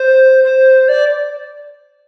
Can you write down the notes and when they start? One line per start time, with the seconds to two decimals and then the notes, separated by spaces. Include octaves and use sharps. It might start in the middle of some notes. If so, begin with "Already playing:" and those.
Already playing: C5
0.44 C5
0.88 D5